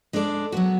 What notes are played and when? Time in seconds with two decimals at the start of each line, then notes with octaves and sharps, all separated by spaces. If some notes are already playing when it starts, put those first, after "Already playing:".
0.13 G#3 D4 A4 D5
0.52 F#3 B3 F#4